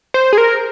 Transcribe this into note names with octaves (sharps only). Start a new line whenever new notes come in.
C5
G#4
A#4